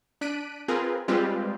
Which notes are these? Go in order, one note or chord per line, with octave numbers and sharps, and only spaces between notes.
D4 F#6 B6 D7 D#7
C4 F4 G#4 A#4 B4
G3 G#3 C4 F4 G4 B4